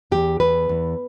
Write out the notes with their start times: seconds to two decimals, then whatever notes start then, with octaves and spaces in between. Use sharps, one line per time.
0.11 E2 G4
0.40 E2 B4
0.69 E2